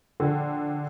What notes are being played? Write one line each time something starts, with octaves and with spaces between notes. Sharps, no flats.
A#1 D3